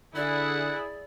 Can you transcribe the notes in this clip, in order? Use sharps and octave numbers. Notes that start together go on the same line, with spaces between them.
D3 E4 G#4 D5 F#5